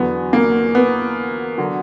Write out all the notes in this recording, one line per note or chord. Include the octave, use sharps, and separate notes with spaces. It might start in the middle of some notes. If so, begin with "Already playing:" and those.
Already playing: E2 D3 F#3 B3
A#3
B3
D3 F#3